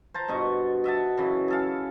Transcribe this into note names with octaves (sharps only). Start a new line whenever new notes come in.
C5 A5 A#5
G2 B2 D#5 C#6
D#5 E5 F#5 A5
F#2 C#3 E3
G#4 A4 F5